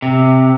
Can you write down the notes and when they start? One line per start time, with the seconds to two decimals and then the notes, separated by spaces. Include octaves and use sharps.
0.02 C3